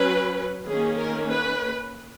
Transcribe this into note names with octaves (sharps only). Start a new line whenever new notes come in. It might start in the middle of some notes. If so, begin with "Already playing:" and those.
Already playing: F#3 C#4 B4
D#3 A#3 C#4 G#4
A#4
B4